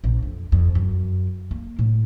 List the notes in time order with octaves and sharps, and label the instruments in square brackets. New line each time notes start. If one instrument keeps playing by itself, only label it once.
[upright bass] A#1
F2
F2
F#2
A#3
A2